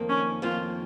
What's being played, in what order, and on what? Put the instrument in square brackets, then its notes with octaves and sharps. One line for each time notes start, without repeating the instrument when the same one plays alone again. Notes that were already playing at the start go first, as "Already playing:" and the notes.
Already playing: [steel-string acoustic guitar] F2 D#3 A#3
[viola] C#4
[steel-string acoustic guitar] F2 D#3 A#3 [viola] F4